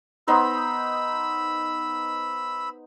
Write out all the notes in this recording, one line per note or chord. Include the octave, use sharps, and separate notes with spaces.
B3 D#4 C5 B5 E6